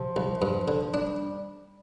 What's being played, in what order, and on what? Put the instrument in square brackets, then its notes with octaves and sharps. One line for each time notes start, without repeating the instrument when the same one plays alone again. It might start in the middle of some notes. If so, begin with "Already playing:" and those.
Already playing: [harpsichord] C3 [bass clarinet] F3
[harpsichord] C2
G2
D3
[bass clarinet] F3
[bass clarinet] G3 [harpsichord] D4